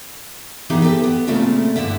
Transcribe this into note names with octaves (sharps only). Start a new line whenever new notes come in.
E3 B3 D#4 G4 G#4
G4 A4 B4
B3
A#2 C#3 A3 C4 E4 F4
G2 D3 B3 E4 E5